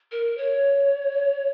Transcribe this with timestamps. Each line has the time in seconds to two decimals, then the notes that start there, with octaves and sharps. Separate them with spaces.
0.12 A#4
0.38 C#5